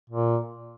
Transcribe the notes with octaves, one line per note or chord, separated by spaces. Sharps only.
A#2